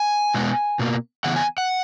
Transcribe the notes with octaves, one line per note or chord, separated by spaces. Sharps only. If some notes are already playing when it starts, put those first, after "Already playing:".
Already playing: G#5
B2 G#3 B3
B2 A#3
C#3 E3 B3 F#5
G#5
F#5